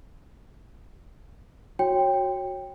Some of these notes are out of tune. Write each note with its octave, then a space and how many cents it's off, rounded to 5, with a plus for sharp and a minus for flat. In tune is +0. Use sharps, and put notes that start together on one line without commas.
F#4 +0 C#5 -15 G5 +10